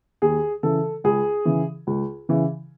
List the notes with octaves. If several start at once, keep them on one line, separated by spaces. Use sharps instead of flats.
D#2 G#4
C#3 E3 A4
C#2 G#4
C#3 E3
C#2
C#3 E3